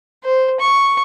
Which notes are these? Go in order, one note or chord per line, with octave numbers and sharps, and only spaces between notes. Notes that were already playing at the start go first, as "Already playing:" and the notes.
C5
C#6